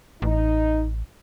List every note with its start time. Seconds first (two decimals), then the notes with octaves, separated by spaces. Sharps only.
0.22 A1 D#4